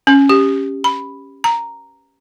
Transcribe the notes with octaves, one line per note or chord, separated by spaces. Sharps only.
C#4
G4
B5
A#5